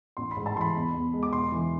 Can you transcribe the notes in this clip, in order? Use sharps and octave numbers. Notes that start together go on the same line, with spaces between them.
A1 C6
B5
G#2
A5
E3 C6
B5
E2
E2
G#3
D6
E1 C6
E3